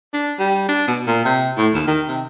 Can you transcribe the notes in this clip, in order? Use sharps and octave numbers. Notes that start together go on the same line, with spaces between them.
D4
G3
D4
B2
A#2
C3
A2
D#2
D#3
C3